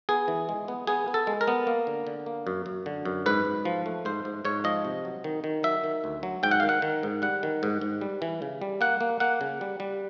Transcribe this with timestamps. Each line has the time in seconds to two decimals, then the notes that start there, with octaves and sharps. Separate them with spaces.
0.09 B3 G#4
0.28 E3
0.49 G#3
0.68 B3
0.87 B3 G#4
1.08 B3
1.14 A4
1.27 G#3
1.41 A#4
1.48 B3
1.67 A#3
1.87 D3
2.07 D3
2.26 A#3
2.47 F#2
2.66 F#2
2.86 D3
3.05 F#2
3.26 G#2 B4
3.45 G#2
3.65 F3
3.86 A3
4.05 G#2 C5
4.25 G#2
4.45 G#2 C#5
4.64 F3 D#5
4.85 C3
5.05 F#3
5.24 D#3
5.44 D#3
5.63 F#3 E5
5.84 D#3
6.04 D2
6.23 F#3
6.43 G#2 G5
6.51 F#5
6.60 D#3 F5
6.69 F#5
6.82 D#3
7.03 G#2
7.22 G3 F#5
7.43 D#3
7.63 G#2
7.81 G#2
8.01 G3
8.22 E3
8.42 C#3
8.61 G3
8.81 A#3 F#5
9.01 A#3
9.20 A#3 F#5
9.41 C#3
9.61 G3
9.80 G3